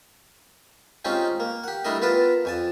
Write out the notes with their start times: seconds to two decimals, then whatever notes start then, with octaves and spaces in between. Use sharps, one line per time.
1.05 G#3 C4 C#4 D#4 F4 G4
1.40 A#3
1.64 G4 F#5
1.85 G3 A3 D4 E4 A#4 D#5
2.02 B3 F4 A#4 B4 A5
2.45 F2 G#5 A5